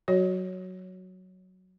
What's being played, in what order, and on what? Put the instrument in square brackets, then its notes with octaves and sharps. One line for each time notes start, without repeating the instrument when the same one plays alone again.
[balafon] F#3 F#4 C#5